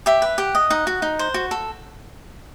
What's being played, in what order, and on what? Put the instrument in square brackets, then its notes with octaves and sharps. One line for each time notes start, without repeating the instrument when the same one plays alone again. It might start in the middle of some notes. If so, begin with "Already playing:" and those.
[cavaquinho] G4 E5
B4
G4 F#5
D#5
D#4 F#5
F#4
D#4
C5
F#4
A4